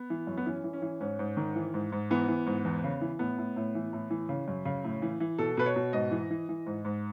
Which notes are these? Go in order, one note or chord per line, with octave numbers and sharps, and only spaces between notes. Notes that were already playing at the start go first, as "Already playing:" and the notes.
Already playing: B3
E3
F#2
B3
E3 C#4
E3
C#4
E3
G#2 C#4
G#2
D#3
E3
G#2
G#2
E3 B3
E3
G#2
E2
C#3
E3
A2 B3
A2
A2
E3
A2
E3
C#3
F#2
C#3
A2
E3
E3
B2 A4
B2 B4
C#5
B2
G#2 D#5
E3
E3
E3
G#2
G#2